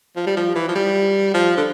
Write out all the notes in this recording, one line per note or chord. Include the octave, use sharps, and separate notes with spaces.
F3
G3
F3
E3
F3
G3
F3
D3